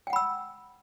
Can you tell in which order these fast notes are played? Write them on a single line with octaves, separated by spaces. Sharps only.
G5 F#5 B5 E6